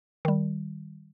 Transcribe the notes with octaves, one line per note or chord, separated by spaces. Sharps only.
D#3 G3